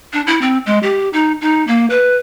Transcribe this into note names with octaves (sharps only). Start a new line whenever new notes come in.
D4
E4
C4
G#3
G4
D#4
D#4
A#3
B4